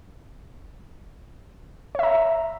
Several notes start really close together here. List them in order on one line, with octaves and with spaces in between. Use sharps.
C#5 E5 A#5